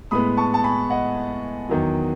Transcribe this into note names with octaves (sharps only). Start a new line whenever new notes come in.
A2 G#3 B3 B5 D#6
A5 C#6
A5
G#5 B5
D#5 F#5
E2 D#3 F#3